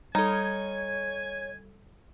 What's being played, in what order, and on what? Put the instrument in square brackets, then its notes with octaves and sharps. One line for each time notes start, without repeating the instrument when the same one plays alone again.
[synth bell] G3 A4 [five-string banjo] D#4 [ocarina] C#5 [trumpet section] G#5